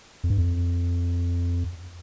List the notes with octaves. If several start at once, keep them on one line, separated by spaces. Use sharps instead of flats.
F2
G2
F2